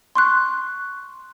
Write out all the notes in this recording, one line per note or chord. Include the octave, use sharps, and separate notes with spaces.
C6 C#6 F#6